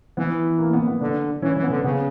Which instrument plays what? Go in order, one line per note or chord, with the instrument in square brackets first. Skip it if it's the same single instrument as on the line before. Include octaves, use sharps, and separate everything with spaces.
[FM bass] E3 [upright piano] B3
[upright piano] A#3
B3
B3
[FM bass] D3 [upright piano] D4
[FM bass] E3 [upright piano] C#4
[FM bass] E3
[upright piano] B3
[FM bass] D3
[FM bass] C#3 [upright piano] B3